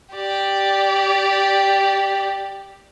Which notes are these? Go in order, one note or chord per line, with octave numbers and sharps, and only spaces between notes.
G4 D5